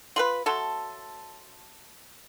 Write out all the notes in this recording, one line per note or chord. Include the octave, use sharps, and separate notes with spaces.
F4 A#4 B4 C6 F#7
F#3 A3 A4 A5 C6 G7